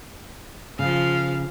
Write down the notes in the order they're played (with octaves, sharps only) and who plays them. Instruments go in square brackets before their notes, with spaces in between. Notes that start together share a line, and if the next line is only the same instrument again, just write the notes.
[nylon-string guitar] C#3 [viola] F3 F5